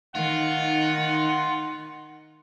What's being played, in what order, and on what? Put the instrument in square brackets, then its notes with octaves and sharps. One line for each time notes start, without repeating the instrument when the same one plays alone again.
[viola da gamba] D#3 D#4 [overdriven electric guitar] F4 [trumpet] F#5